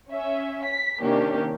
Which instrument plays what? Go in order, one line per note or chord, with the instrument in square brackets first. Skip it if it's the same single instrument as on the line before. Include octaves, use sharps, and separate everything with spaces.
[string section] C#4 E5
B6
C3 D#3 A#3 C#4 D4 G4